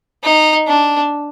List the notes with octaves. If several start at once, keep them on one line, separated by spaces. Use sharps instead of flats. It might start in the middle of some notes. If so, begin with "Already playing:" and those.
D#4
D4